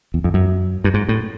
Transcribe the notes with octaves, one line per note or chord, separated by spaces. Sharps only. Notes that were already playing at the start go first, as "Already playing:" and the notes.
E2
F2
F#2
G2
G#2
A2